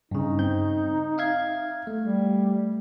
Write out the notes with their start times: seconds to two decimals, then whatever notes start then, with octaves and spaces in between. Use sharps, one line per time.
0.11 G2 C#3 D#4
0.39 C4 G6
1.18 E5 F5 G#6
1.87 A3
1.99 G3